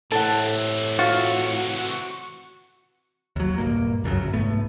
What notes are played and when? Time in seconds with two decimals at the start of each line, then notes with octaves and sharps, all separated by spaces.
0.12 A2 C3 E3 A4 F#5
0.99 F4 F#4
3.36 D#2 F#3
3.58 D#1 G#1 G2 A#3
4.04 C#2 F#2 C#3 F#3
4.21 D1 G#1
4.33 C2 G#2 A3 B3